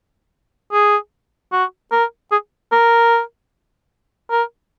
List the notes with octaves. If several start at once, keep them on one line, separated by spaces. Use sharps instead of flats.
G#4
F#4
A#4
G#4
A#4
A#4